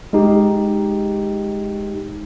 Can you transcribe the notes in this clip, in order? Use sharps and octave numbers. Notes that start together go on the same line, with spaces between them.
G#3 D#4 G4